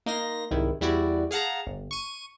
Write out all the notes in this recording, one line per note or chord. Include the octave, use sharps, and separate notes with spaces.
A#3 D#4 C6 A#6
C2 G#2 D#3 E4
E2 G3 E4 F#4 D5
G#4 F5 F#5 A5 A#5
G1
C#6 D#7